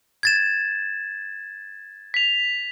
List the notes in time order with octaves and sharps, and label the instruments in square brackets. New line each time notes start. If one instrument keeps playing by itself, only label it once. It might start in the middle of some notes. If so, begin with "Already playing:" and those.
[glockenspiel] G#6 A6 E7
[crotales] B6 F7